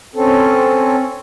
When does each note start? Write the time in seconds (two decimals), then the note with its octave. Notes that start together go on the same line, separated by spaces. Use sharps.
0.15 C4 C#4 A4